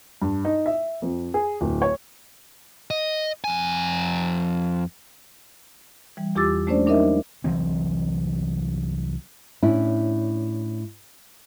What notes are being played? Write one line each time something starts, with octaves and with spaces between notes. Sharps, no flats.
G2
D#4
E5
F2
G#4
D1
C#5
D#5
F2 G#5
E3 G3
E2 F4 G4 D6 E6 A6
G#3 A3 C#4 D4 C5 D5
F#3 D4 D#4 A#4 D#5 E5
C2 E3 F#3 C4
A2 C#4 D4 E4